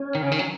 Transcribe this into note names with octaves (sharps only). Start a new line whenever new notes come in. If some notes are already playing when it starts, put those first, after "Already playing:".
Already playing: C#4
D#3
C#3
D#3
F#3